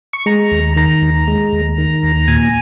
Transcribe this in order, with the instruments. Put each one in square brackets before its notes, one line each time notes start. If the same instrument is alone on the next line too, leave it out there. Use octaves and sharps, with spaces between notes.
[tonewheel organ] C#6
G#3 A#5
D#2
D#3 A#5
D#2
G#3
D#2
D#3
D#2
A#2 G#5